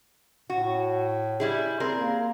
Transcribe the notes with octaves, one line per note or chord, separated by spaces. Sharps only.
A2 F#4
G3 E4 G#4
C4 G#4 A#4
A#3